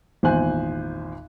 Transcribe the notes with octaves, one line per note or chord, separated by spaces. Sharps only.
G#1 E2 A#2 C5 G#5 F#6